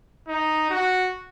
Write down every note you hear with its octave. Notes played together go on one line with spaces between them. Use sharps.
D#4
F#4